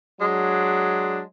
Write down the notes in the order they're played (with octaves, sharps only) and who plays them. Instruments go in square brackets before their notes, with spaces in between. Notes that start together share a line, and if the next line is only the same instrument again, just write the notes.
[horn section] F#3 G#3 D4